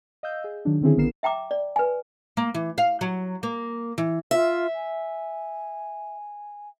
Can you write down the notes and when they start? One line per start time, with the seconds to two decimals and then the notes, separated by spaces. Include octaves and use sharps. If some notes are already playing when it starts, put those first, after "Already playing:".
0.23 D#5 F5 E6 G6
0.44 G#4
0.65 D#3 F#3 D4
0.82 D3 D#3 C4 C#4 E4 G#4
0.97 A#1 B3 E4 A#4 C7 E7
1.23 E5 G5 A#5 D6
1.51 D5
1.76 B4 G#5
2.37 A#3
2.54 E3
2.78 F5
3.01 F#3
3.43 A#3
3.98 E3
4.31 F4 E5
4.75 G#5